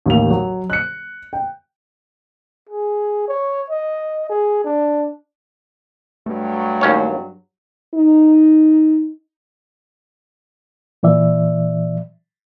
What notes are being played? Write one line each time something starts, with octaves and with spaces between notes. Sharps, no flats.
A1 D#2 A#4 F7
F#3
F#6 C#7
G5
G#4
C#5
D#5
G#4
D4
G2 F#3 A3
D#2 C#4 C#5
D#4
A#2 E3 D5 E5